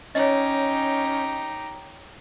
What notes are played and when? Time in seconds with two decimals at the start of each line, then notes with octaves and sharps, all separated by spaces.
0.15 C#4 D#4 G4 C#5 D#5